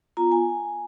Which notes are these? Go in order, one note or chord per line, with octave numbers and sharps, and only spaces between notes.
B3 F4 A#5
G#5